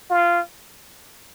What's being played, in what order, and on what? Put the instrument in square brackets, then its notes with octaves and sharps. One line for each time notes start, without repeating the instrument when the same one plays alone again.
[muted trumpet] F4